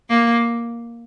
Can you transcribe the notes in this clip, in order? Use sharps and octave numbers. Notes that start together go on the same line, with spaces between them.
A#3